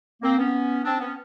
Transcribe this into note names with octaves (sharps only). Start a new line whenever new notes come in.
A#3 C4
B3 C#4
C4 D4
B3 C#4